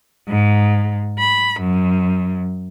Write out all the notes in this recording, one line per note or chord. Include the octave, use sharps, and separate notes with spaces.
G#2
B5
F#2